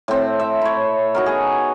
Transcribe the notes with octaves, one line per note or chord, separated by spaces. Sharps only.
A2 C4
E5
E4 C#5
D#4 F#4 A#4
B3 G#4